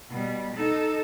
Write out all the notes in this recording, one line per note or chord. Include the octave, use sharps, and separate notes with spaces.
B2 G3
D#4 A4